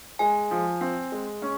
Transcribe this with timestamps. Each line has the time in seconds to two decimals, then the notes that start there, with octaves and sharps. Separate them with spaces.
0.19 G#3 G#5
0.51 F3
0.81 C4
1.12 G#3
1.42 C#4